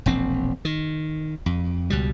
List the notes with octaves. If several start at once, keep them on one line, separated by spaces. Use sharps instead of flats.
E1 A#1 C4
D#3
F2
C#2 B2 G3